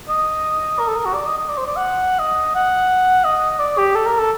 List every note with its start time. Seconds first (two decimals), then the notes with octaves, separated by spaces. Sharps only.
0.09 D#5
0.79 A#4
0.88 A4
0.96 A#4
1.06 F#4
1.14 D5
1.26 D#5
1.38 D#5
1.49 D5
1.58 C5
1.67 D5
1.76 F#5
2.19 D#5
2.55 F#5
3.24 D#5
3.59 D5
3.78 G4
3.95 A4
4.06 A#4
4.19 A4